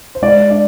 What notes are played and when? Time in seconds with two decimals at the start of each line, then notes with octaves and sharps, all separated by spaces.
0.15 C5
0.22 G#3 D5
0.51 D4 D5